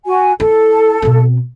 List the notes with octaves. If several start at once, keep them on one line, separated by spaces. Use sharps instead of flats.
F#4 G#5
E4 A4
B2 C4